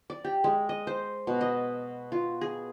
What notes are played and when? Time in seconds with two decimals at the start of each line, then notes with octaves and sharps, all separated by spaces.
0.10 D5
0.24 G4
0.44 G#3
0.69 D#5
0.87 C5
1.27 B2
1.41 D#5
2.12 F4
2.41 G#4